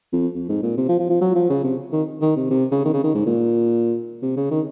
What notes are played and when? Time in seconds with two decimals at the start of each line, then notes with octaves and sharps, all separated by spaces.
0.13 F2
0.35 F2
0.49 G#2
0.63 A#2
0.78 C3
0.89 F3
1.00 F3
1.10 F3
1.21 F#3
1.35 F3
1.50 C#3
1.64 C3
1.92 D#3
2.22 D#3
2.36 C3
2.50 C3
2.72 C#3
2.85 D#3
2.93 C#3
3.04 D#3
3.15 G#2
3.26 A#2
4.23 C3
4.37 C#3
4.51 D#3